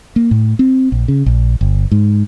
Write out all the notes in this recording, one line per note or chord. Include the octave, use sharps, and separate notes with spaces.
A#3
A2
C4
A#1
C#3
A#1
G1
G#2